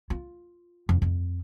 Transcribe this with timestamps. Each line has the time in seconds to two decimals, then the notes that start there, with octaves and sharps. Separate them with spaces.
0.10 F4
0.89 F2
1.02 F2